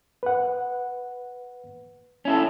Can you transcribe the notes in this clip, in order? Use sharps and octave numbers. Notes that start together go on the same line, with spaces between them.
B4 F#5
C#4 E4 A4